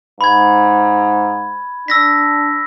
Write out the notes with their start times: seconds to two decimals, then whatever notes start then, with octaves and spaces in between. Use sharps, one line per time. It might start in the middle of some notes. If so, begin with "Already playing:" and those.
0.21 G#2 B5 G#6
1.88 D4 E6 A#6 B6